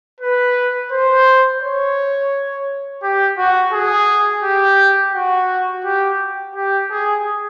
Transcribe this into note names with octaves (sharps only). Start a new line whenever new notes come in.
B4
C5
C#5
G4
F#4
G#4
G4
F#4
G4
G4
G#4